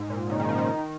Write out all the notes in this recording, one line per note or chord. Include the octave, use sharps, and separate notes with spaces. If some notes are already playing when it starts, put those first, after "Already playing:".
Already playing: G#2
A#2
C#3 D#4
D#3
F3
D#3